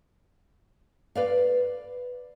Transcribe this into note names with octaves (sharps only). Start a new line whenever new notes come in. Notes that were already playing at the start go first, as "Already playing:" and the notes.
B4 D5 F5